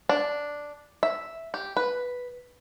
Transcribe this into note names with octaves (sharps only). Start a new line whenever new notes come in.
D4
E5
G4
B4